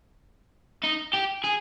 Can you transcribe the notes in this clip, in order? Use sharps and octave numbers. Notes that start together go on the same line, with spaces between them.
D#4
G4
G#4